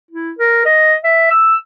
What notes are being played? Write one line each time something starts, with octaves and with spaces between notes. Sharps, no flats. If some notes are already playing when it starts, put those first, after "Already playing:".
E4
A#4
D#5
E5
E6